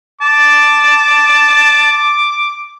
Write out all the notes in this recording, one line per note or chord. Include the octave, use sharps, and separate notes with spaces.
A5 D6